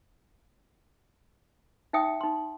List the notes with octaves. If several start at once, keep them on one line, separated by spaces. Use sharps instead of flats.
D#4 E5 G5 D#6
D#4 C6